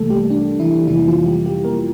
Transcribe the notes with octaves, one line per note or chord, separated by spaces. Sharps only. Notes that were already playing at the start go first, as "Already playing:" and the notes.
Already playing: C2 C3 E3 G3 A3 A#3 A4
G3 G4
D4
E3 E4
F2 C3 E3 G3 A#3 E4
F3 F4
G3 G4
G3 G4
A#3 A#4